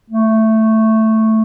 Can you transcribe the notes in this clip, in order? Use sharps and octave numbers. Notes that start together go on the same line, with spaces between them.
A3